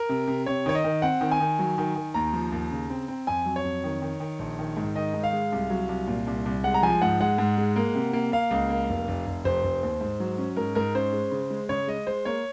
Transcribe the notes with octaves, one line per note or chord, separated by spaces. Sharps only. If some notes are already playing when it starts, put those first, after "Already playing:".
Already playing: A#4
C3
C3
C3 C#5
D#3 C#5
D#5
D#3
C4 F#5
D#3
G#5
D#3
F#3
D#3
D#3
D#2 A#5
F3
D#2
C#3
C4
C4
F2 G#5
F#3
C#5
F2
D#3
D#3
D#3
A#1
D#3
G#2
D#3 D#5
G#2
F5
G#3
C2
F#3
C2
A#2
C2
C2
G#3 F#5
A#5
F3 G#5
G#2 F#5
G#3 F#5
G#2
G#3
A#3
C3
A#3
A#3 F5
C#2
A#3
F1
F1
F1
F1 C5
F1
D#2
G#2
F#3
C#4
G#2 A#4
G#2 A#4
C#4 C5
G#3
C#3
G#3
C#3 C#5
G#3 D#5
G#3 C5
A#3 C#5